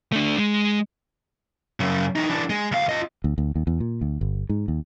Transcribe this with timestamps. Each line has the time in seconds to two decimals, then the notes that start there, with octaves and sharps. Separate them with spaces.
0.13 A3 D4
0.38 G#3
1.80 F#2 C#3
2.15 E3 D#4
2.30 E3 D4
2.50 G#3
2.72 D2 F5
2.89 F4 D#5
3.24 D2
3.38 D2
3.56 D#2
3.67 E2
3.80 A#2
4.01 D2
4.21 G1
4.49 G#2
4.68 D#2